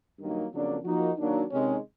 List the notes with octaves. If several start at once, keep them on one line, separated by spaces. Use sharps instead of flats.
G2 D#3 F#3 A#3 D#4
F2 C#3 F#3 A#3 D4
F3 A#3 D#4 F#4
D#3 F#3 A#3 D4
C3 D#3 G#3 C#4